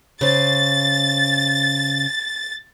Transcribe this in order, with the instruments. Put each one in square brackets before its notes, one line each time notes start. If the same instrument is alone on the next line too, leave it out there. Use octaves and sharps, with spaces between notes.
[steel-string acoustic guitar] C#3 C5 [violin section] A6